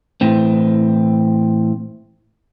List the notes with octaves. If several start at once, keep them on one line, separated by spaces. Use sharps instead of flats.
A2 E3 C4